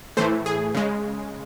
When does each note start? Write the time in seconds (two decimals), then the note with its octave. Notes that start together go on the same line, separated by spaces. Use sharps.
0.17 A2 E3 A3 C5
0.46 G#4
0.75 C#3 G#3